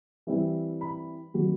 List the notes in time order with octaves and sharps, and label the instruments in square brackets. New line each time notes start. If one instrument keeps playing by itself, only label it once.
[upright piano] E3 G3 C4 E4
B5
C3 D#3 F#3